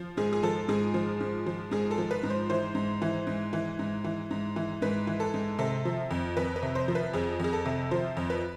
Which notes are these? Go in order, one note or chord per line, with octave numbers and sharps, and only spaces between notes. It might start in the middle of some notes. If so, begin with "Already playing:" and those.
Already playing: F3
G#2 G#4
G#4
F3 A4
G#2 G#4
F3
G#2
F3
G#2 G#4
A4
F3
B4
G#2
C5
E3 C5
G#2
E3
G#2
E3
G#2
E3
G#2
E3
G#2 B4
E3
A4
G#2
C3 A4
F3
F2
F2 B4
B4
C3
C5
F3
B4
F2 G#4
F2 G#4
A4
C3
F3 C5
F2
B4